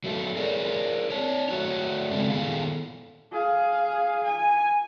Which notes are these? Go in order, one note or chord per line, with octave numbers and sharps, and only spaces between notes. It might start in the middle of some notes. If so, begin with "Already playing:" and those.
F#3 A3 A4
G#4 A#4 C#5 D5
D4 C#5
A3 F#4 C#5
C#3 F#3 G#3 C4 D4
A#2 D#3 B3 G#4 A4 F5
G#4 F5
G#5